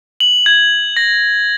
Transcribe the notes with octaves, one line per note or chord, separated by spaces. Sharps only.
F#7
G#6
A#6